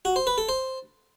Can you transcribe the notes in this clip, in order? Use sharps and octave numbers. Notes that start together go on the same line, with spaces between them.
F#4
C5
B4
A4
C5